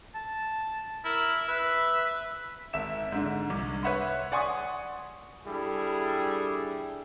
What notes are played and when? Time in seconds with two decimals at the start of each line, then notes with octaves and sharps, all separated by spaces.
0.15 A5
1.05 E4 A#4
1.48 B4 E5
2.73 G#1 E5 E7
3.12 G#2 D3
3.50 C2
3.83 B4 C#5 E5 F#5 B5 C6
4.32 D5 F#5 G#5 C6 C#6 D#6
5.46 G3 D4 E4 G#4 A4